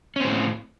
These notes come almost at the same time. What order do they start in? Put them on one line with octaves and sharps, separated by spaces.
C#4 C4 A2